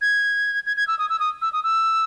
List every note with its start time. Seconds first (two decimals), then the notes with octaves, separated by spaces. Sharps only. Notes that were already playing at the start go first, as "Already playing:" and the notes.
0.01 G#6
0.66 G#6
0.77 G#6
0.88 E6
0.99 D#6
1.09 E6
1.20 D#6
1.42 E6
1.53 D#6
1.64 E6